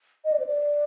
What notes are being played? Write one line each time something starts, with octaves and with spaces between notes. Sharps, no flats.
D#5
D5
C5
D5